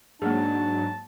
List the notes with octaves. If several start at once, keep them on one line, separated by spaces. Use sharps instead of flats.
G#2 F#3 A#3 D4 G#4 A5